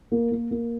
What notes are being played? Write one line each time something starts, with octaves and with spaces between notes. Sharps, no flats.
A#3
A#3
A#3